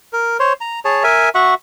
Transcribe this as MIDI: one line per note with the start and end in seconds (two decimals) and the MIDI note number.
0.13 0.37 70
0.40 0.53 72
0.40 0.53 73
0.61 0.80 82
0.85 1.03 68
0.85 1.03 73
0.85 1.03 81
1.03 1.29 70
1.03 1.29 76
1.03 1.29 80
1.35 1.54 66
1.35 1.54 76
1.35 1.54 78
1.35 1.54 85